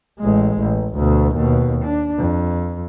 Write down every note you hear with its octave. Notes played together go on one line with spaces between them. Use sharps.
A1 G#3
A1
D2 B2
D#2 B2
D4
F2